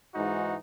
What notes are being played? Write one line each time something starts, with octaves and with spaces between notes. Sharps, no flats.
G#2 E3 G#3 D#4 F#4